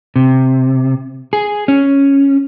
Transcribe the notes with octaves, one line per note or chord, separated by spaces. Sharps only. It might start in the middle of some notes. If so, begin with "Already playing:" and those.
C3
G#4
C#4